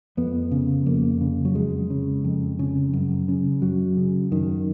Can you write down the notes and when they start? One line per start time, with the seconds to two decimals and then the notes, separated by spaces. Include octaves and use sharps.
0.17 F2 B3
0.52 C#3
0.86 F2 A#3
1.21 C#3
1.45 F#3
1.55 F2 G#3
1.90 C#3
2.24 F2
2.59 C#3
2.93 F#2
3.28 C#3
3.62 F#2 F#3
3.97 C#3
4.32 F#2 D#3